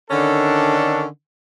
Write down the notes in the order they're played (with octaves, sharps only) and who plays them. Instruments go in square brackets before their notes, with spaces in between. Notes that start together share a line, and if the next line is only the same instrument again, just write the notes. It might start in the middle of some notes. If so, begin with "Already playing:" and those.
[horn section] D3 D#3 C#4 D4 A4